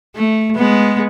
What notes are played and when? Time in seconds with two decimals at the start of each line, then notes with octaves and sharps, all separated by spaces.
0.15 A3
0.56 G#3 B3